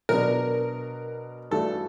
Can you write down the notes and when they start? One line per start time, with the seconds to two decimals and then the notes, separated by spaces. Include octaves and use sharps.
0.09 B2 F#3 B3 D4 A#4
1.51 G2 E3 A3 D4 F#4 A4